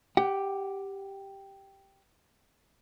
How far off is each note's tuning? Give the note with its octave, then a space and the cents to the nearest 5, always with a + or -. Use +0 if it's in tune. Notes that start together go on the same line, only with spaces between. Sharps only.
G4 +0 F#5 +25